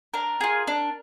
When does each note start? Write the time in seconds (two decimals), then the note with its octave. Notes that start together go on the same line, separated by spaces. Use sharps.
0.14 D4 A#4
0.41 F4 G#4
0.67 D4